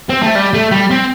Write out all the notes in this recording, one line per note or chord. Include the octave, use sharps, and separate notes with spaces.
C4
A3
G3
A3
G3
C4